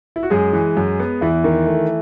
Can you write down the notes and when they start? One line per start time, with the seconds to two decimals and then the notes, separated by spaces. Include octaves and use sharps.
0.16 E4
0.23 F#4
0.30 F#2 G#3 G#4
0.53 E3
0.77 F#2
1.00 B3
1.21 E2 E3 E4
1.44 D#3
1.67 A3